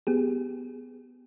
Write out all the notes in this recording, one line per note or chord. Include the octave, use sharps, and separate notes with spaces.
B3 G4 G#4